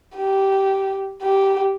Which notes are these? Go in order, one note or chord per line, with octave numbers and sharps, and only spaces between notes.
G4
G4